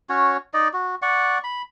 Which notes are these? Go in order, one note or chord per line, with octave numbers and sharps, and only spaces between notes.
C#4 F#4 C#5
D#4 D5 D#5
F#4
D5 F#5 C#6
B5